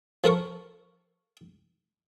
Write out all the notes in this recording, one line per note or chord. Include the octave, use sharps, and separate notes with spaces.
F3 A4 A#4 C#6